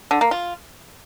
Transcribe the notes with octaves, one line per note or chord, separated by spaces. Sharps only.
D3
A#3
F4